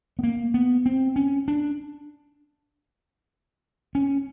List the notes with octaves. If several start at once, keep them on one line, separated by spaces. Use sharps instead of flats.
B3
A#3
B3
C4
C#4
D4
C#4